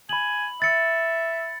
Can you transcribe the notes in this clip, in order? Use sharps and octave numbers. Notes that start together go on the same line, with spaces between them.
G#5 B5 F#7
E5 A6 C#7